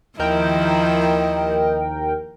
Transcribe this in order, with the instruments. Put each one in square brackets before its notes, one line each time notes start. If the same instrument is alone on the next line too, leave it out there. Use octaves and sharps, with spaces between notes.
[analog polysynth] D#2 A#4 G5 [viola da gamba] D#3 F3 E4 [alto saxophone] D#5